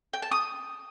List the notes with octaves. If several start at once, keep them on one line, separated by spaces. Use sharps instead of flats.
G5
A5
D#6